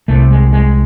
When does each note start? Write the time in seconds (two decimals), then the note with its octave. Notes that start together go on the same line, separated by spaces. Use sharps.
0.08 C2 C3 A3
0.31 G#3
0.53 G#3